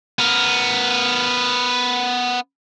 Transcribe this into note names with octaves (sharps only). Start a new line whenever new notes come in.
B3 A#4